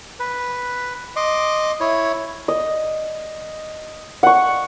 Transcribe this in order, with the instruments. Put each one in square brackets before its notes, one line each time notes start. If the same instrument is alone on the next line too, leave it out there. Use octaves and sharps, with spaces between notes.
[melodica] B4
D#5 C6 D6
E4 C#5
[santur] D#5
F#5 C#6